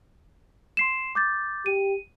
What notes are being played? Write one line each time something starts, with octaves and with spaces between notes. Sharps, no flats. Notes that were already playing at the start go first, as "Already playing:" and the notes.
C6 C7 E7
D6 G6 A6
G4 D#7